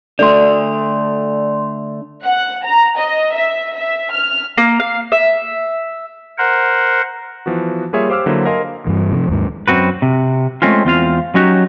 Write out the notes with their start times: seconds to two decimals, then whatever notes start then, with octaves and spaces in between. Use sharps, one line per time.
0.19 D3 A3 D4 D5 C6
2.24 F#5
2.65 A#5
2.98 D#5
3.34 E5
3.75 E5
4.13 F6
4.58 A#3
4.80 F5
5.12 E5
6.38 A#4 C5 F#5
7.46 E3 F3 B3 F#4
7.93 G3 A#3 F4 G#4 C#5 E5
8.09 G4 C5 F5 D6 E6 F6
8.26 D3 F#3 A#3 E4 C5
8.45 A#4 C5 D#5 F5 G#5 C6
8.87 G2 E3
9.12 C3 F3
9.29 D#2 G#2
9.68 F#2 C4 F#4 B4
10.02 C3
10.62 G#3 A3 C4 C#4 F4
10.85 E2 C4 F4 F5
11.35 F#3 C#4 D#4 F#4 G4